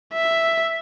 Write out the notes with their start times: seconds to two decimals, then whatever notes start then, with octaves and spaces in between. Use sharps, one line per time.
0.14 E5